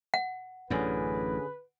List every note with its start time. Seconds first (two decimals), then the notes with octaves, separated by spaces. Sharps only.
0.14 F#5
0.70 A1 F#2 D3 C#4 G#4 B4